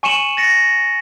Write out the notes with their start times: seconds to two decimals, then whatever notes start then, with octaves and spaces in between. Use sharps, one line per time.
0.03 G#5 C#6 C#7 D#7 E7 F#7
0.37 A6 A#6 C#7